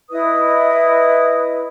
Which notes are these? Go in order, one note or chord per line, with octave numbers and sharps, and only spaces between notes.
E4 B4 D#5 D#6